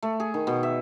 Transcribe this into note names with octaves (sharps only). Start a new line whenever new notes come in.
A3
G#4
D#3
B2
E5